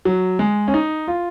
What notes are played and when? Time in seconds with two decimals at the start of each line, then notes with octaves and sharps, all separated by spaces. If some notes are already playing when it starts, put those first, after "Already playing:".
0.05 F#3
0.39 G#3
0.68 C#4
0.74 D#4
1.08 F4